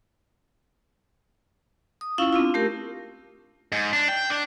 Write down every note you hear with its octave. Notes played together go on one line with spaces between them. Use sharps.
D#6
C#4 E4 F4 F5 C#6 E6
C4 D4 F4
A3 G4 A#4
G#2
D4
G5
D4